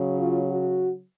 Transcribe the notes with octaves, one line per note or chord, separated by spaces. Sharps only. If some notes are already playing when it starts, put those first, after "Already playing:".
Already playing: C#3 F#3
F4
F#4